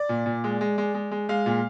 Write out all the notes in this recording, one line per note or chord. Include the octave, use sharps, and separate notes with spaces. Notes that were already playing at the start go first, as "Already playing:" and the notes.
Already playing: D5
A#2
A#2
G#3
G#3
G#3
G#3
G#3
G#3 F5
A#2